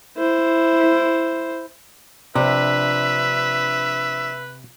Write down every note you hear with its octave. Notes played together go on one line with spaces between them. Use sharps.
E4 C5
C3 F3 D4 B4 E5 A#5